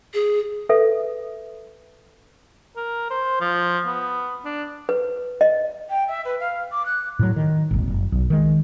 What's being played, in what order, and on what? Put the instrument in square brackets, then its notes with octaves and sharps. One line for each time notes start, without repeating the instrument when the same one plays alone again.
[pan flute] G#4
[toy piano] A4 B4 E5
[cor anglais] A#4
C5
F3
B3
D4
[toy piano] B4
D#5
[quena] G5
E5
B4
F5
D6
F#6
[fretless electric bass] A2 F#3
D#3
D#1 G#1
F#1
B1
D#3 G#3